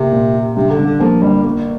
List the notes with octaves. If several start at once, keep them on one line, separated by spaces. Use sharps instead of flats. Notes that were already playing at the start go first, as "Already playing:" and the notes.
Already playing: C3 A#3
A#2
G4
G2 C3
D3
G2
D3
F3 A#3
G1 G3
A#3